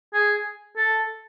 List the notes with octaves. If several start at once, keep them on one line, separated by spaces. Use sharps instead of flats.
G#4
A4